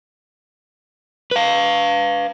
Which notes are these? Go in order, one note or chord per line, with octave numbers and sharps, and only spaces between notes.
B4 F5